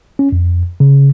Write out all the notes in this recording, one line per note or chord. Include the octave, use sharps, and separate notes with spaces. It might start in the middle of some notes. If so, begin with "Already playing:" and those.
C#4
F2
C#3